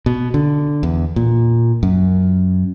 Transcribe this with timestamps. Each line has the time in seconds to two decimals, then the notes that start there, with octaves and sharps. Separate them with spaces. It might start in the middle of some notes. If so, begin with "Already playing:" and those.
0.06 B2
0.34 D3
0.83 E2
1.16 A#2
1.83 F#2